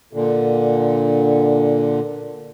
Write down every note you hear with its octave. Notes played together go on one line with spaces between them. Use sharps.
A#2 D3